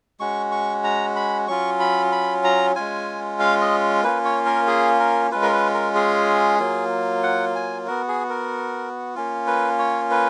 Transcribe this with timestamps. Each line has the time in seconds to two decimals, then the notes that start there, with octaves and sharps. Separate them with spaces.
0.20 G#3 C#4 F#4 C#6
0.52 C#6
0.84 A#5
1.16 B5
1.48 F#3 C#4 F4 C#6
1.80 B5
2.12 B5
2.44 A#5
2.76 G#3 C#4 F4 G#5
3.40 F5
3.61 D#5
4.04 A#3 C#4 F4 B4
4.25 C#5
4.46 A#4
4.67 G#4
5.00 A#4
5.31 G#3 C#4 F4 B4
5.43 A#4
5.53 B4
5.74 A#4
5.95 G#4
6.59 F#3 A#3 F4
7.23 F#5
7.55 G#5
7.87 B3 F#4 A#4
8.08 G#4
8.29 A#4
9.15 A#3 C#4 F4
9.47 B4
9.79 C#5
10.11 B4